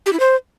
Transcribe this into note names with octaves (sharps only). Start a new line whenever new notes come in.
G4
E4
C5